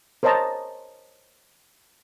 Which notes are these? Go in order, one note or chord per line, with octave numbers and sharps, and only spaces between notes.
A#4 C5 C#5 D#5 A5 A#5